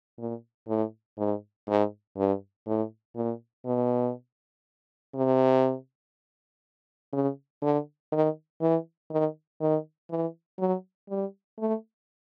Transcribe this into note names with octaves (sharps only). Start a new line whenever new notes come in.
A#2
A2
G#2
G#2
G2
A2
A#2
B2
C3
C#3
D3
D#3
E3
D#3
D#3
E3
F#3
G3
A3